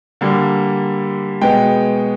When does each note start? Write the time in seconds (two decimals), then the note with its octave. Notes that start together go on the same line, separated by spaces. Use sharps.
0.21 D3 G3 A#3
1.41 B2 G#3 B3 G5